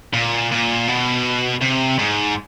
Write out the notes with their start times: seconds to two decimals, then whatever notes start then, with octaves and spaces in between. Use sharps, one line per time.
0.14 A#2
0.51 A#2
0.88 B2
1.62 C3
1.99 G#2